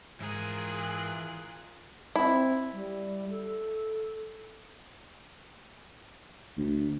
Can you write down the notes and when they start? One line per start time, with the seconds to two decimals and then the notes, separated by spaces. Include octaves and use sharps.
0.21 G#2 E3 F4 G#4 A#4 A#5 F#6
2.16 C4 E4
2.73 G3
3.30 A4
6.58 D2